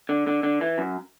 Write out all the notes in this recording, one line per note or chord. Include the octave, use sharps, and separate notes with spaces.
D3
D3
D3
E3
F#2